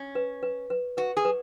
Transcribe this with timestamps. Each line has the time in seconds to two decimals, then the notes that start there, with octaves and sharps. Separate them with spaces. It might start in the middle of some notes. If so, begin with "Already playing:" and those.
Already playing: C#4
0.15 B4
0.43 B4
0.70 B4
0.97 F#4 B4
1.17 G#4
1.25 B4